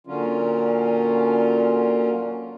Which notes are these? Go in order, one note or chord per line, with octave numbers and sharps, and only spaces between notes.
A#2 D3 F#3 C#4 F4